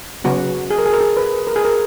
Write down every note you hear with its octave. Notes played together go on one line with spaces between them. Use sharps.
C#3 F#3 B3 F#4
G#4
A#4
G#4
A#4
G#4
B4
A#4
G#4
A#4